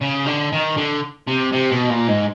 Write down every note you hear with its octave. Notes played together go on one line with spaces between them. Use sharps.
C#3
D3
D#3
D3
C3
C3
B2
A#2
G#2